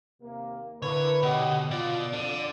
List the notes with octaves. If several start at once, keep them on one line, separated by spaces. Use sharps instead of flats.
D#2 C3 A#3
D3 E4 A#4 B4 C#5
B2 G4 D#5 F#5
B2 F4 D5
F2 D3